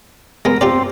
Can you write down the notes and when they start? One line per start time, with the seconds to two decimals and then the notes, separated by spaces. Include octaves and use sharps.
0.45 G#3 B3 A#4
0.61 C4 F4 G4 D5